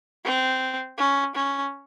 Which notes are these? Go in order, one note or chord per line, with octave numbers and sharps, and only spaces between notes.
C4
C#4
C#4